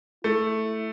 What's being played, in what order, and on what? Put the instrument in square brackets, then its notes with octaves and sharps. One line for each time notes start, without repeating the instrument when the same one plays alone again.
[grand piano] A3 [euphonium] E4